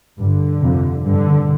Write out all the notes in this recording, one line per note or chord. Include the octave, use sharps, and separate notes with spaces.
G2 D3
F2 C3
G2 D3